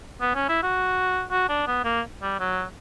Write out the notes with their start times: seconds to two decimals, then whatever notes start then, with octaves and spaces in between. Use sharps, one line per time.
0.21 B3
0.35 C#4
0.49 E4
0.63 F#4
1.31 F#4
1.49 D4
1.67 B3
1.84 A#3
2.22 G3
2.40 F#3